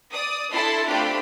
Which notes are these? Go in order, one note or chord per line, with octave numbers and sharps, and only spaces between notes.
D5 D#6
D4 E4 A4 A5 B5 C6
A3 C4 D4 F4 G4 B5